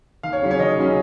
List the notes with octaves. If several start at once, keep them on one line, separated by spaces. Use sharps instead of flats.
D#2 F5
C#5
C#3 F#3 C#4
C#5
D#2 D#5
C#3 F#3 C#4